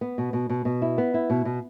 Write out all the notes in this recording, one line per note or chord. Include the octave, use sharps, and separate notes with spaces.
B3
B2
B2
B2
B2
E4
B3
E4
B2
B2